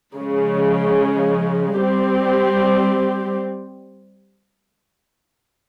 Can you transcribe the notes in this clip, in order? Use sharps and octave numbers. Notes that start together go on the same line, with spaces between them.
C#3 F3 G#3
G3 C4 G4